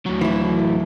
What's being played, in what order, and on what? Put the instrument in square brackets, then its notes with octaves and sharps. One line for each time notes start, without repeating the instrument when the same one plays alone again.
[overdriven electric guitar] D2 F#3
[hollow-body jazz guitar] E3 E4